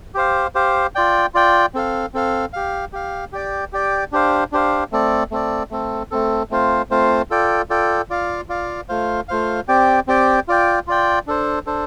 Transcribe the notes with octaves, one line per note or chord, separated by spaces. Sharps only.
G4 C5 F5
G4 C5 F5
F4 D5 G5
F4 D5 G5
C4 A4 F5
C4 A4 F5
G4 F5
G4 F5
G4 D5 G5
G4 D5 G5
D4 G4 C5 F5
D4 G4 C5 F5
A3 C4 A4 D5
A3 C4 A4 D5
A3 C4 A4
A3 C4 A4
A3 C4 F4 C5 F5
A3 C4 F4 C5 F5
F4 A4 D5 G5
F4 A4 D5 G5
F4 D5 F5
F4 D5 F5
A3 F4 C5 F5
A3 F4 C5 F5
C4 G4 D5 G5
C4 G4 D5 G5
F4 D5 G5
F4 D5 G5
D4 A4 C5
D4 A4 C5